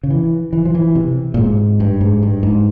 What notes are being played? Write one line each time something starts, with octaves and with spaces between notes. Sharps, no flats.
C#3
E3
E3
F3
E3
C3
A#2
G#2
G2
G#2
G2
G#2